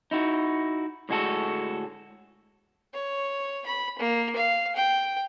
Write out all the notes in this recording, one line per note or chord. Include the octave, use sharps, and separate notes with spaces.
D#4 E4 F#4
A2 D3 G#3 C4 F#4 A4
C#5
B5
A#3
F5
G5